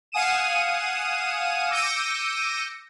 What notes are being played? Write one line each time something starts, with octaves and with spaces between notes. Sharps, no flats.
F5 F#5 G#5 D#6 D#7 E7
D6 E6 G6 A#6 C#7 D#7